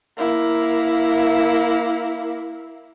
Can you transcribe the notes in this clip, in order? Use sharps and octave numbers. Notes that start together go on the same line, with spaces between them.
A#3 E4